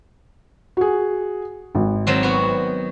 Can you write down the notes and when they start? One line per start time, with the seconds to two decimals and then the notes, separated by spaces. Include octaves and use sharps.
0.77 F#4 G#4
1.75 G#1
2.07 D#3 F#3 C4
2.23 B3 F#4